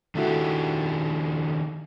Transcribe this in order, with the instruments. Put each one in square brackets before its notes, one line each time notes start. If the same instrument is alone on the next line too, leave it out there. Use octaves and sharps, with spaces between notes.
[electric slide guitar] D#3 D4 G4 [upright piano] A3 E4 F#4